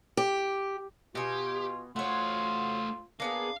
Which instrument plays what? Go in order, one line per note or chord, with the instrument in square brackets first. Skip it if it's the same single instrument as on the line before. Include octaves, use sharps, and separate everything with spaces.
[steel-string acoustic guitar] G4
[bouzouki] B2 G#5 [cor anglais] F4 [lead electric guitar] G4
[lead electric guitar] A3 C5 [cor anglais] F4 [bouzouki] F#4 C#5
[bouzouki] A#3 B3 G#4 [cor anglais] D4 [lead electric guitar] F5